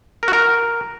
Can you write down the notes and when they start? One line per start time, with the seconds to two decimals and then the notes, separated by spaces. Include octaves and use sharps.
0.23 A#4
0.28 F#4
0.33 A#4